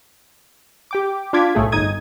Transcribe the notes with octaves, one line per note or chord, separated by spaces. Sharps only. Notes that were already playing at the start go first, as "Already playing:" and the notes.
G4 G5 D6
D4 F4 D6 G#6 B6
B1 A2 A3 G#4
G1 D#4 D#6 G#6 D#7